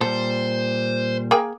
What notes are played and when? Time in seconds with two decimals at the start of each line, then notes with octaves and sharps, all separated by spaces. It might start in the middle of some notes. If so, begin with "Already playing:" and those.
0.01 A#2 G3 A4 C5
1.31 A#3 G#4 G5